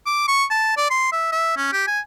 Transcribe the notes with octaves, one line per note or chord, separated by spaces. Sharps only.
D6
C#6
A5
D5
C6
E5
E5
C#4
G4
G#5